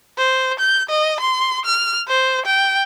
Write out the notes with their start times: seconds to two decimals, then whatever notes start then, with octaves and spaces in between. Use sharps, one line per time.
0.18 C5
0.59 G6
0.89 D#5
1.20 C6
1.65 F6
2.08 C5
2.46 G5